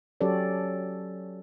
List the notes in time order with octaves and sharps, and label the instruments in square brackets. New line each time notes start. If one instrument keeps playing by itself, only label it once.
[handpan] F#3 C#4 G4 A4 C#5 D5